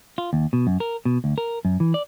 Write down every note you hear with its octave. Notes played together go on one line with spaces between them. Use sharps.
F4
D#2
B2
F#2
A#4
B2
D2
A#4
F#2
E3
D5